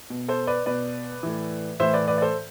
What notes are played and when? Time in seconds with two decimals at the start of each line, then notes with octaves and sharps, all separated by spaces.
0.10 B2
0.28 A4 C5
0.47 B4 D5
0.66 B2 B4 D5
1.23 A2 E3
1.80 A2 E3 C5 E5
1.94 B4 D5
2.08 B4 D5
2.18 D5
2.22 A4 C5